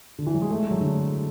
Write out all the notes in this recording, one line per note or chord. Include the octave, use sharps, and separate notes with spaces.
D3
E3
F#3
G#3
A3
G#3
F#3
D3